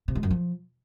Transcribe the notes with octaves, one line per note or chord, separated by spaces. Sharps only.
C3
G#3
F#2
F3